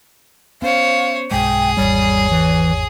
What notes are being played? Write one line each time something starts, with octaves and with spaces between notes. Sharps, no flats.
B3 C#4 C5 C#5 F5
B1 G2 G#3 G#4 G5 D#6
G#1 E2 G3 C#5
E3